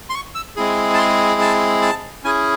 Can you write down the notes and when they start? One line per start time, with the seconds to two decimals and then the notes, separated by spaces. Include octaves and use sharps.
0.10 C6
0.14 C#6
0.35 E6
0.56 G#3 C4 E4 G#4
0.94 A5
0.98 C6
1.41 A5
1.82 A5
2.24 C#4 E4 G#4 G#5